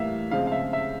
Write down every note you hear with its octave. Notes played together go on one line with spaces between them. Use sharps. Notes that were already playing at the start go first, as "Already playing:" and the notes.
Already playing: A2 E3 G3 A#3 E5 F5
C#3 F3 G#3 C4 F5
F5
E5
E5